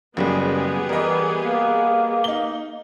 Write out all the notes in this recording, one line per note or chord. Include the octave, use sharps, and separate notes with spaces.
F#1 F#2 C#3 G3 B3 G4 G#4
E3 G3 A#4 D#5
A#3
D#4 G7